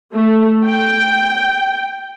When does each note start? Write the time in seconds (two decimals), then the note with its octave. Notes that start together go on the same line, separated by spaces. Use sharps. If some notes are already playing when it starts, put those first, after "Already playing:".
0.13 A3
0.65 G5